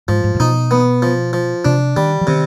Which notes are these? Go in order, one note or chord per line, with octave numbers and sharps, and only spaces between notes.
G#2 F3
G#2
G#2
B2 D#4
B3
F3
F3
C3 D4
D#3 G3
F3
C3 D#3